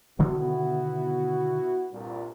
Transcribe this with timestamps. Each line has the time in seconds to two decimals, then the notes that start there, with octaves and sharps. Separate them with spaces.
0.19 B2 D3 D#3 B3 E4 F#4
1.92 C2 G2 A#2